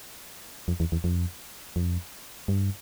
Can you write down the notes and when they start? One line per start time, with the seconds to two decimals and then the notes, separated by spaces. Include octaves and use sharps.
0.68 F2
0.80 E2
0.92 E2
1.04 F2
1.76 F2
2.48 G2